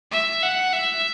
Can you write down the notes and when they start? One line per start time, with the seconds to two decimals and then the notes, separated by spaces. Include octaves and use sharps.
0.11 E5
0.43 F#5
0.73 E5